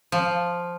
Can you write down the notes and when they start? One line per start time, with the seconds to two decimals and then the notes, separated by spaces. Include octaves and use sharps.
0.12 F3